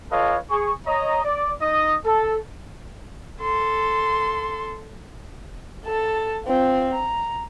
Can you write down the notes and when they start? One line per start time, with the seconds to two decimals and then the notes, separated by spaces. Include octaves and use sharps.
0.11 F4 A4 B4 C#5 D#5 F5
0.50 G#4 C#6
0.86 C#5 D#5 A#5
1.24 D5
1.61 D#4 D#5 D#6
2.05 A4
3.41 A4 C6
5.86 A4 A5
6.45 C4 F4
6.93 A#5